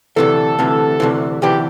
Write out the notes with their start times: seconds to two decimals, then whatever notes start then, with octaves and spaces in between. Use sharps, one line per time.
0.16 D2 C3 E3 A4
0.59 D2 C3 E3
1.00 D2 C3 E3
1.42 D2 C3 E3 G4